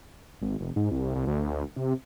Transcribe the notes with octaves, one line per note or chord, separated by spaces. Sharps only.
G#1
F1
G#2
C2
C2
D2
D2
C3